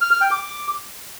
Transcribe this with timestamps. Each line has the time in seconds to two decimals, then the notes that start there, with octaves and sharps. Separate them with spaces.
0.01 F6
0.11 F6
0.21 G5
0.31 D6